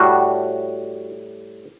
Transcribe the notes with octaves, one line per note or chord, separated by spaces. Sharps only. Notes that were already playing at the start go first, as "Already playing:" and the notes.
Already playing: A2 G3 F#4